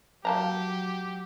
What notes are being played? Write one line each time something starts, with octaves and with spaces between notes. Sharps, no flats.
F#3 A#3 G4 A5 A#5